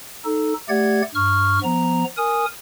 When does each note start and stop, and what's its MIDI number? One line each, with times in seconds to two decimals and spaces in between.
0.25 0.54 63
0.25 0.54 69
0.69 1.02 57
0.69 1.02 67
0.69 1.02 74
0.69 1.02 78
0.69 1.02 92
1.15 1.59 43
1.15 1.59 85
1.15 1.59 89
1.63 2.04 53
1.63 2.04 59
1.63 2.04 82
2.17 2.46 70
2.17 2.46 80
2.17 2.46 87